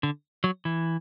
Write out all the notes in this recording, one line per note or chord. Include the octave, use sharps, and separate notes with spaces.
D3
F#3
E3